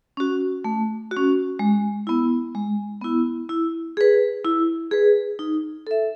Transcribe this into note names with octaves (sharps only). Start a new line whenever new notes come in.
C#4 F#4
A3
F#4
C#4
G#3
B3 E4
G#3
B3 E4
E4
G#4 B4
E4
G#4 B4
D#4
A4 E5